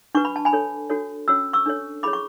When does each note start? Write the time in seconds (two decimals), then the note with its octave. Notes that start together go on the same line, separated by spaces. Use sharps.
0.15 D4 F#4 B4 C#6
0.25 B5
0.36 A5
0.45 G#5 B5
0.53 D4 A4 C#5
0.90 D4 F#4 A4 C#5
1.28 C#4 F#4 C#5 E6
1.53 C#6 E6
1.66 D4 A4 C#5
2.03 E4 G#4 C#5 B5 D6
2.13 C#6